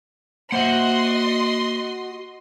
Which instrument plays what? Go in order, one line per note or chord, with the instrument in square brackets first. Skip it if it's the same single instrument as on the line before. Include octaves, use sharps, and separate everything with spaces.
[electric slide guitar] A#3 C5 E5 [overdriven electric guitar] F#4 F#5 [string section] D#5 C6